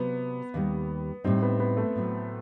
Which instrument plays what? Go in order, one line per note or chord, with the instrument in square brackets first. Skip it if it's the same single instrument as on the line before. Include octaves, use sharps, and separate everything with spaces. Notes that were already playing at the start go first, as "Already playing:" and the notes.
Already playing: [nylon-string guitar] C3 F#3 C4 [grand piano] B3
[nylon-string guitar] D#2 D#3 G3
[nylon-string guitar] A2 G3 D#4 [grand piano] C4
[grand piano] B3
B3
A3
[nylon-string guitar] A2 F#3 C4